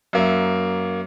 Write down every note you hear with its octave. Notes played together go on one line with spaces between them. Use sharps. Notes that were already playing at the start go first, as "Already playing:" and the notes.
F#2 A#3 E5